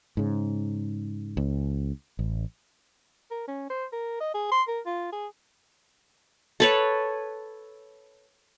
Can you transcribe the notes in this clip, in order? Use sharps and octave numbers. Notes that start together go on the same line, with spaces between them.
G#2 C#3
C#2
A1
A#4
C#4
C5
A#4
D#5
G#4
C6
A#4
F4
G#4
A4 B4 C#5